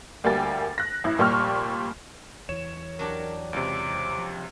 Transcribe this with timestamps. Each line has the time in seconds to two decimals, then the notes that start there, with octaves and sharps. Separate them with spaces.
0.24 D2 G3 A#3 G5 G#5 A6
0.78 F#6 A#6
1.04 A1 E4
1.18 F1 A#2 G3 G4 C#6 F6
2.49 E2 E3 C#5 E7
2.99 F#3 D4 G4 A#4
3.53 C#2 C3 D6
4.18 F3